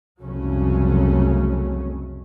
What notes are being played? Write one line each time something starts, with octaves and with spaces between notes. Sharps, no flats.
C2 F2 C#3 F#3 A3 C#4